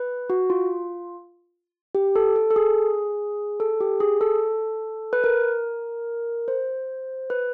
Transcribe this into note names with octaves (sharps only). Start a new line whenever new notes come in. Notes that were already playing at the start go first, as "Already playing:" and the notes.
Already playing: B4
F#4
F4
G4
A4
A4
A4
G#4
A4
G4
G#4
A4
B4
A#4
C5
B4